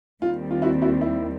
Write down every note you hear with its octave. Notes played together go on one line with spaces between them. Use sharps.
D#2 D#3 G3 C4 F4
F4
E4 F#4
E4 F#4
E4